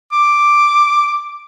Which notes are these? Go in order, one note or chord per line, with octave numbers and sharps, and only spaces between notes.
D6